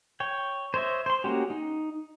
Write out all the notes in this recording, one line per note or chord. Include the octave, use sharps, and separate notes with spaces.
C#5 G5
C5 C#5 D#5 E5
C5 C6
G#3 A#3 C#4 F#4 G4
D#4